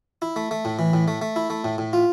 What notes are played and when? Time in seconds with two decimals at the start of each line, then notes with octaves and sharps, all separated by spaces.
0.22 E4
0.36 A3
0.51 A3
0.65 A2
0.79 E3
0.93 A2
1.08 A3
1.22 A3
1.36 E4
1.50 A3
1.64 A2
1.78 A2
1.93 F4